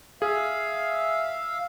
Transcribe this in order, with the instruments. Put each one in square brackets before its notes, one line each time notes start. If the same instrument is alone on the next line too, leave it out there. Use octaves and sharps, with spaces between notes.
[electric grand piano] G#4 [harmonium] E5 F5